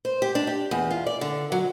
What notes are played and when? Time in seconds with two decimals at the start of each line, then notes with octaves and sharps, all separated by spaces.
0.05 C5
0.22 G4
0.35 D4
0.47 G4
0.71 E2
0.91 F4
1.07 D5
1.21 D3
1.52 F#3